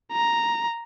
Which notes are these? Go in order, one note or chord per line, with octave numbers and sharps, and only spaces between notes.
A#5